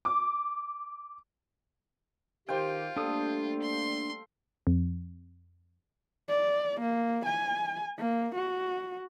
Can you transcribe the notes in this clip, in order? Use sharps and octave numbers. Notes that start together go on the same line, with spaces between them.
D6
D#3 F4 G4 C5 F5 G5
G3 A3 A#3 D4 A4 D#6
C6
F2
D5
A#3
G#5
A#3
F#4